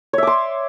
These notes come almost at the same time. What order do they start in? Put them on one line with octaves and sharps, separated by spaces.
C#5 E5 D6 C6